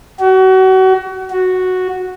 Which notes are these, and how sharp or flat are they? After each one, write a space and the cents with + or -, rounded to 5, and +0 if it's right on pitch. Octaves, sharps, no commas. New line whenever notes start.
F#4 +30
F#4 -5